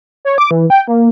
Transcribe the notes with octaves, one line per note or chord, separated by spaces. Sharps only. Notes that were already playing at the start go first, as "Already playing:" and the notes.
C#5
D6
E3
G5
A#3